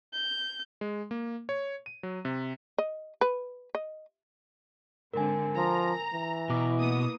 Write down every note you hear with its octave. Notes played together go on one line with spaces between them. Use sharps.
G6
G#3
A#3
C#5
D#7
F#3
C3
D#5
B4
D#5
G#2 D3 C4 A#4 G#5
F3 A#5
E3
B2 E4 D6
A#3 B3 D#6